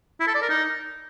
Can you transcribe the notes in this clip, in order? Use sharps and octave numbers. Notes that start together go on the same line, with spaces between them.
E4
A4
D5
A#4
D#4